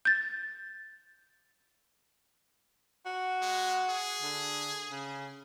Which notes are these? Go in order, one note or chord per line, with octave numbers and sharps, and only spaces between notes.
G6 A6
F#4
G#3
G#4
D3
C#3